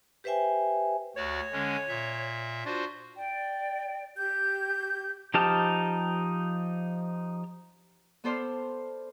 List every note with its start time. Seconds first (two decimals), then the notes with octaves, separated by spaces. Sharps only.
0.24 G4 B4 C5 E5 G5 G#5
1.16 D2 F#4 C#5 D5
1.53 D3 G#3 C#4
1.88 A#2 E5
2.65 D4 F4 F#4 C5
3.17 D5 G5
4.17 G4 G6
5.34 F3 D#4 G4 A5 F6
8.24 B3 A4 C5 D5 C6 F6